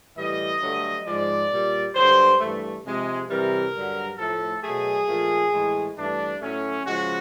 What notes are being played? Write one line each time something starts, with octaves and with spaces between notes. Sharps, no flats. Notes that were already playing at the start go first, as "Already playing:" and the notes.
A2 E3 G3 D#5
G2 D3 F#3 A3
G#2 F3 G#3 D5
A#2 G3
G2 D3 F#3 C5
G2 E3 A3
C3 F3 G#3
C3 E3 G3 A#4
G2 D3 F#3
A2 F3 A3 A4
B2 F#3 A3 G#4
A#2 F3 A3
A2 E3 G#3
G2 E3 A3 D4
A2 F#3 A3 C#4
C#3 F3 G#3 F#4